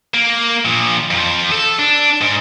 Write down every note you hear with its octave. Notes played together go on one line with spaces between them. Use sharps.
A#3
A#2 F3
F2 F3
A4
D4
G#2